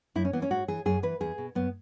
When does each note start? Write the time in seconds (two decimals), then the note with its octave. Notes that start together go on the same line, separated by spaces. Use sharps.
0.15 F#2 E4
0.25 C#4
0.33 E3 B3
0.42 C#4
0.50 G#2 F#4
0.68 E3 G#4
0.86 F#2 G#4
1.03 E3 B4
1.20 E2 G#4
1.38 B2
1.55 F#2 B3